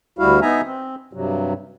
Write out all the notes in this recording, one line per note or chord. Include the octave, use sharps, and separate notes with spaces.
D2 G3 E4 F#4 F5
B3 D#4 E5 G#5 A#5
C4
G2 C3 F#3